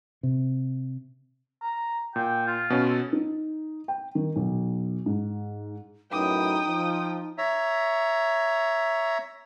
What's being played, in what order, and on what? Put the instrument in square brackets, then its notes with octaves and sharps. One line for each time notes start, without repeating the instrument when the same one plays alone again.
[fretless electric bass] C3
[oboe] A#5
[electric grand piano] A#2 [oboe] G5
[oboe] F4
[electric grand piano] B2 C#4
[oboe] A4
[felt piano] D#4
G5
D#3
B1
G#2
[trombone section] F#2 A2 B4 [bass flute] D#4 [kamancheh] G5 D#6
[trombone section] F3
[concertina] C#5 E5 A#5